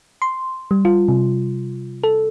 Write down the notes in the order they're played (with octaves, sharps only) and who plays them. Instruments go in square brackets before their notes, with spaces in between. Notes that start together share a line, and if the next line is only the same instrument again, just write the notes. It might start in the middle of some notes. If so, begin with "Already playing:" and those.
[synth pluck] C6
G3
F4
C3
A4